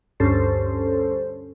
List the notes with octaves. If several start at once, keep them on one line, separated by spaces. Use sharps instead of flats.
D2 G2 C#4 A4 C5